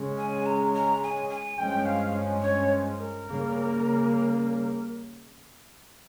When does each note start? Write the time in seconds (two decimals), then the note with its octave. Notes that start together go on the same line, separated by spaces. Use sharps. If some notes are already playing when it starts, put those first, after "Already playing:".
Already playing: C#3 G#3 C#4
0.18 G#5
0.46 A#5
0.74 A#5
1.03 G#5
1.30 G#5
1.58 G2 F3 G#3 C#4 G5
1.86 F5
2.42 C#5
2.98 A#4
3.26 C#3 G3 A#3